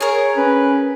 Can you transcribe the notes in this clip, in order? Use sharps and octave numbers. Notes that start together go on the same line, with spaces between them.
G#4 A#4 C#5
C#4 B4